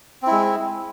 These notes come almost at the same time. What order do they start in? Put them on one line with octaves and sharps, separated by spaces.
C4 E4 G#3